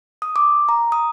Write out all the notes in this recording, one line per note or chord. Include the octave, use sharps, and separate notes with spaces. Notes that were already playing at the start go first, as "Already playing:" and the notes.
D#6
D6
A#5
D#6